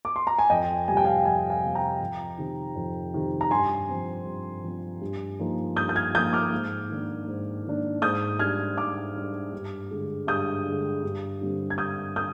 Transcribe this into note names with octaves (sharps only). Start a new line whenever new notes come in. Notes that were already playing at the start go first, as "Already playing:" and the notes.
D6
C6
A#5
G#5
F2 D#5 G5
C3 G3 G#5
G5
F5 G#5
F2 F5 G#5
F5 G#5
C3 G3
G5 A#5
F2
C3 D#3
F2
C3 D#3
A#5
G2 G#5 C6
F3 C4
G2
F3 C4
G2
F3 A#3 D#4
G2 D#6 G6
G6
F6 G#6
F3 A#3 D#4 D#6 G6
D6 F6
G#2
D#3 A#3 D4
G#2
D#3 A#3 D4
G#2 D#6 G6
G3 D4 F6 G#6
G#2 D6 F6
G3 D4
G2
D3 G#3
G2 D#6 G6
D3 G#3
G2
D3 G3 C4
G#6
G2 D#6 G6
D3 D#6 G6